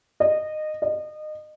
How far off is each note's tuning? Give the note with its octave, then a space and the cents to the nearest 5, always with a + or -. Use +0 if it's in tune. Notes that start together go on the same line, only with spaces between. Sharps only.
D#5 -20
D#5 -25